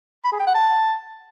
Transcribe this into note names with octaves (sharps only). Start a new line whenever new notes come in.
B5
G#4
G5
F#5
A5